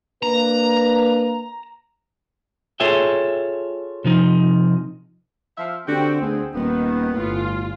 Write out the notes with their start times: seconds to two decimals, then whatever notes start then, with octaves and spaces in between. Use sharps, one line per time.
0.23 A#3 D4 B4 A#5
2.80 F4 G#4 A4 C#5 E5 G5
4.04 C3 F3 D#4
5.58 F3 E5 F5
5.88 D3 C4 F#4 G4 G5
6.21 D2 B3 G#4
6.55 D#1 D#3 B3
7.15 G1 A2 F4